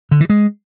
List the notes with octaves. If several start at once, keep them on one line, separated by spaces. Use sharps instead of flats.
D3
E3
G#3